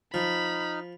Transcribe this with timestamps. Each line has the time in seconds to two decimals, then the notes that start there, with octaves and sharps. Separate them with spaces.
0.14 F3 D#4 B5 F6